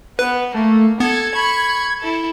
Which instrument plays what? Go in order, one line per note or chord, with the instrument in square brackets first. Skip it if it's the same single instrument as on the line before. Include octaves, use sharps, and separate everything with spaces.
[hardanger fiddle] B3 [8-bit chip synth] B4
[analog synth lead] A3 [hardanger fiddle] A#3
[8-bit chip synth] B3 [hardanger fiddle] A4 [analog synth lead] G#6
[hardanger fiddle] B5 C#6
E4 A4